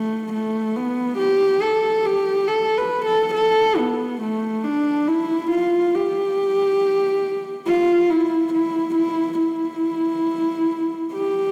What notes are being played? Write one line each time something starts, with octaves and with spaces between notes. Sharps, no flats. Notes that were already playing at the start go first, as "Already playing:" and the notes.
Already playing: A3
A3
B3
G4
A4
G4
A4
B4
A4
A4
B3
A3
D4
E4
F4
G4
F4
E4
E4
E4
E4
G4